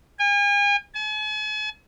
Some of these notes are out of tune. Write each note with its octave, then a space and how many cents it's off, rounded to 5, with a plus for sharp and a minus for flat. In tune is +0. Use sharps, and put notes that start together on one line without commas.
G#5 -40
G#5 +45